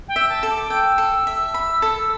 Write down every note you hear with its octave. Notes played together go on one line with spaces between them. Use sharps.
G5
E5
A5
A4
D6
G5 E6
A4
E5
B5
A4